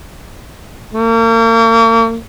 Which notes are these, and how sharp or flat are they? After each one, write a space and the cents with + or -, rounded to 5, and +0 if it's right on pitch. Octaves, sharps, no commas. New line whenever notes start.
A#3 -40